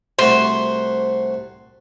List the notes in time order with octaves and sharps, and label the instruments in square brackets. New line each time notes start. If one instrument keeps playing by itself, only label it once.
[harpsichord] C2 A3 F#4 [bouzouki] C5